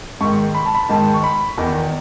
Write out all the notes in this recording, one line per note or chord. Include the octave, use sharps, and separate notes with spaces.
G#2 D#3 C#6
B5
A5
B5
G#2 D#3 A5
C#6
B5
E2 D#3